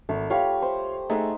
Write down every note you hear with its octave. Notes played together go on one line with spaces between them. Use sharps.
G#1 A3
F4 G4 C#5 F5 G5 B5
C5
A3 D#4 G#4 E5 F#5